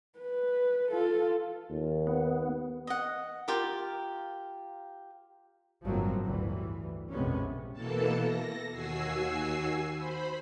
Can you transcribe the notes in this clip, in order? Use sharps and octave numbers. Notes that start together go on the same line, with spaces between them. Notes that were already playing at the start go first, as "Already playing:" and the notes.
B4
F4 A4
D#2
B3
D#5 F#5
F4 G4 A#4
G1 A2 F3 F#3 A#3 C4
D2 G2 E3
A#1 F2 C3 G#3 B3 C#4
B2 E3 A#3 A4 A5
A#6
D#2 F#4 G#5 E6 C7
C5 B5